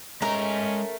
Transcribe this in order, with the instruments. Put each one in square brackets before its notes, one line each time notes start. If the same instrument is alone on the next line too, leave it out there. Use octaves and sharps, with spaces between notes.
[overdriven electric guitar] G#3 A#5 [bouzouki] A3 A#4 [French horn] C#4 [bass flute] D#5